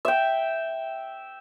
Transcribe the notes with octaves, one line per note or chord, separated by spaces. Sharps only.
E5 G5